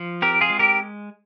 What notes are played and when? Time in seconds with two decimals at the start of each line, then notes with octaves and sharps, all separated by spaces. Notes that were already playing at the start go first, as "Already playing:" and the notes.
Already playing: F3
0.22 C4 G4 A#4
0.41 F4 G#4
0.50 G#3
0.59 G4 A#4